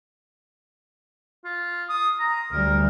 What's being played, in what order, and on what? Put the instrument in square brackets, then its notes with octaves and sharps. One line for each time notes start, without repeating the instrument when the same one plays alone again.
[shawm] F4
D#6
A#5
[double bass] D2 G3 [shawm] A#4